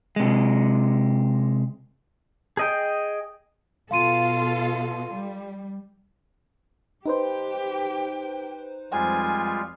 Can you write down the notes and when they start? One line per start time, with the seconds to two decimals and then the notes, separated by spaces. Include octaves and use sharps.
0.16 C3 G#3
2.57 G#4 D#5 G5
3.91 B2 F4 A4 F5 C6 D#7
5.12 G3
7.06 D#4 G4 B4 C5 G5
8.92 F2 G3 G#3 F4 G#5